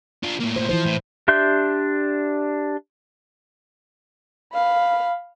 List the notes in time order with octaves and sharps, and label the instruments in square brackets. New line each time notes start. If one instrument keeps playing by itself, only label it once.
[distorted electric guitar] D4 F4
A2 A#3
[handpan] C5
[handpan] E3 E4 C5 [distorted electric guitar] F3
[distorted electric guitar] A2
[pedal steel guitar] D4 G4 E5 C6 G6
[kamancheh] F5 B5